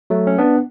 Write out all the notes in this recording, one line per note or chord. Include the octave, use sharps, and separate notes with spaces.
F#3 A3
C#4
B3 D4